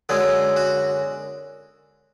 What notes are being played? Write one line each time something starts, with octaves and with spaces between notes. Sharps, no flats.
F#2 D3 G#3 G#4
F#4